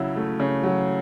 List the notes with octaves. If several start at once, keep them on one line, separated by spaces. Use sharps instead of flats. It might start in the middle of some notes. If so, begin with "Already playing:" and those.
Already playing: C#3 F#3 E4
A3
C#3
F#3